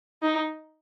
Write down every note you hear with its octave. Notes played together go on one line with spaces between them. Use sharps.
D#4